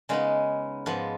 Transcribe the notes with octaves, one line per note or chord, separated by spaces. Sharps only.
C#3 G#3 B3 D#4
G#2 F3 B3